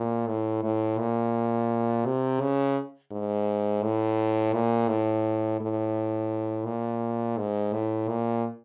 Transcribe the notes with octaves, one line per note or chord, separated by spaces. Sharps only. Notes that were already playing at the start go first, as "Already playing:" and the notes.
Already playing: A#2
A2
A2
A#2
C3
C#3
G#2
A2
A#2
A2
A2
A#2
G#2
A2
A#2